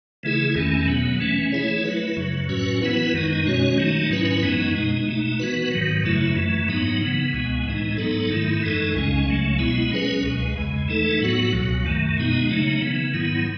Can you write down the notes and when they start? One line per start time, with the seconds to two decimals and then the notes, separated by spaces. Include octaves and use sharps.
0.23 C#3 E3 A3 E4 G#4
0.55 E2 D#3 A3 C#4
0.87 B2 F#3 B3
1.20 E3 A3 C#4
1.52 E3 A3 E4 G#4 C#5
1.85 F#3 A3 E4 B4
2.17 F#2 C#3 F#3
2.49 A2 F#3 C#4 F#4 B4
2.81 E3 B3 E4 B4
3.14 F#2 D#3 G#3 D#4
3.46 B2 G#3 C#4 F#4 C#5
3.78 D#3 F#3 A3 D#4
4.10 G#2 F#3 C#4 E4 B4
4.42 F#2 E3 G#3 B3 D#4
4.75 B2 G#3 D#4
5.07 B2 A3 D#4
5.40 E3 B3 F#4 B4
5.71 G#2 D#3 F#3
6.04 F#2 C#3 F#3 A3 E4
6.36 F#2 E3 A3
6.68 G#2 F#3 B3 D#4
7.01 C#3 E3 B3
7.33 C#2 B2 G#3 B3
7.65 A2 E3 G#3 D#4
7.97 G#2 F#3 B3 D#4 A4
8.30 G#2 D#3 A3 E4
8.62 F#2 E3 G#3 D#4 A4
8.95 C#2 C#3 G#3 C#4
9.27 C#2 C#3 F#3 A3
9.59 B2 G#3 B3 E4
9.92 F#3 C#4 G#4 B4
10.23 C#2 B2 G#3
10.55 E2 C#3 G#3
10.88 E3 A3 D#4 A4
11.20 A2 F#3 B3 F#4
11.52 C#2 B2 F#3
11.85 F#2 D#3 A3
12.17 B2 G#3 B3 D#4
12.49 C#3 F#3 A3 D#4
12.81 C#3 E3 B3
13.14 G#2 D#3 F#3 B3 E4